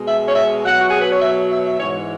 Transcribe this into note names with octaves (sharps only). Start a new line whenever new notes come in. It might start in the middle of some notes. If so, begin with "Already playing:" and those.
Already playing: B2 G#3
E5
C#5
E5
B2 F#3 F#5
F#4
G#4
B4
C#5
E5
E5
E5
G#2 E3 G#3 C#5